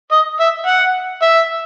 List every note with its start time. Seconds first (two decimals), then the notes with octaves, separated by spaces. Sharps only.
0.12 D#5
0.40 E5
0.66 F#5
1.22 E5